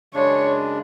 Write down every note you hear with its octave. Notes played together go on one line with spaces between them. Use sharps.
F#2 C#3 G#3 D4 C#5